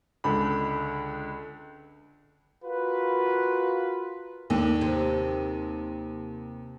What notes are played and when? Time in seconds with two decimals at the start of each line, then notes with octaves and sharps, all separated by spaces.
0.24 C#2 D3 B5
2.65 F4 F#4 A#4 B4
4.50 D#2 D3
4.81 C3